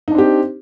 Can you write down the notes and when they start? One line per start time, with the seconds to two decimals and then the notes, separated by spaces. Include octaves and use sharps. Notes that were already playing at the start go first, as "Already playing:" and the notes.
0.08 D#4
0.11 D4
0.15 C4
0.18 G4